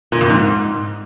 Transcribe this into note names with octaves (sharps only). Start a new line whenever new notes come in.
A#2
F2
G#2